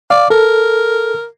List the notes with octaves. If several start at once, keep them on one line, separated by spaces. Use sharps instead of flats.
D5 F5
A4 A#4